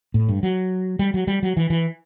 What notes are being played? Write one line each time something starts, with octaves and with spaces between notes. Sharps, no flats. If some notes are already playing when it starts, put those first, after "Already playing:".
A2
G2
F#3
G3
F#3
G3
F#3
E3
E3